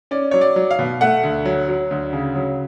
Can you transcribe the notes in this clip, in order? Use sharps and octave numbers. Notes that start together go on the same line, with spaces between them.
C#4 D5
F#3 C#5
D5
F#3
F5
B2
A3 F#5
D2
F#3
F#3
D2
C#3
F#3